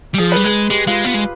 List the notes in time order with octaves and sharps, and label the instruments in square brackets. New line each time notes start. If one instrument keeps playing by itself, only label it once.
[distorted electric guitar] G3
[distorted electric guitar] F3 [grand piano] G#4
[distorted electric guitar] G3 [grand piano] B4
[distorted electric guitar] G#3 [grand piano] G#4
[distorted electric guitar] G#3 [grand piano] G4
[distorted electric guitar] G#3 [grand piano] F4
[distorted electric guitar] B3 [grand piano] F4
[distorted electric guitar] G#3